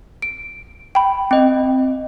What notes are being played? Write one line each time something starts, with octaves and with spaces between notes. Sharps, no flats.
D7
G5 B5
C4 D#5 G5